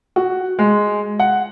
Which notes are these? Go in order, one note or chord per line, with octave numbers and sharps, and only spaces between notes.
F#4
G#3
F#5